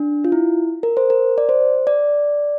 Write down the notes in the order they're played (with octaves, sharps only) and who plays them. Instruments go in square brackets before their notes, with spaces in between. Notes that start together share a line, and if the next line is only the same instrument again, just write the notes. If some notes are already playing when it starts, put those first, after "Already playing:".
Already playing: [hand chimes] D4
F4
E4
A#4
C5
A#4
D5
C5
D5